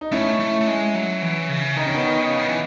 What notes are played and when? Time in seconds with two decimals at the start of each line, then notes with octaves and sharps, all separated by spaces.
0.01 D#4
0.12 A3 C#4 E4
0.40 A3
0.61 A3
0.67 G#3
0.95 F#3
1.22 E3
1.49 C#3
1.76 D#3 D#4
1.86 C#4
1.94 B3 D#4
2.29 C#3
2.39 D#3
2.48 E3